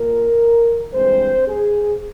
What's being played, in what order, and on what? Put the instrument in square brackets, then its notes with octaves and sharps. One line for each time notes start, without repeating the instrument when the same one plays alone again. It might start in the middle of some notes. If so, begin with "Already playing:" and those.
Already playing: [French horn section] A#2 A#4
G2 E3 G#3 C4 C5
G#4